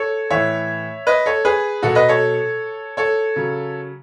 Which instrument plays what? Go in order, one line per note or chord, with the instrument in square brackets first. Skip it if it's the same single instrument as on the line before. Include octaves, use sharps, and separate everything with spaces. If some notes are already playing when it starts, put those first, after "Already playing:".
Already playing: [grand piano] A4 C#5
A2 E3 C#5 E5
B4 D#5
A4 C#5
G#4 B4
B2 F#3 F#4 A4
B4 D#5
A4 C#5
A4 C#5
C#3 F#3